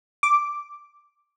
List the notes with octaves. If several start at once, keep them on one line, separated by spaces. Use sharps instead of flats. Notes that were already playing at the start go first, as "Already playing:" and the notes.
D6